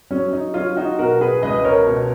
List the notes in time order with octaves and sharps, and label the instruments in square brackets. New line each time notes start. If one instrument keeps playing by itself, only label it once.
[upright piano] F#3 C#4
D#4
F#3 C#4 F4
D#4 F#4
B2 F#4 A#4
G#4 B4
C#2 B4 D#5
A#4 C#5
B2